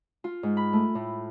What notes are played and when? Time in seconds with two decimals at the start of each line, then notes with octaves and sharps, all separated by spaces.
0.24 F4
0.43 G#2
0.57 B5
0.73 A3
0.95 A2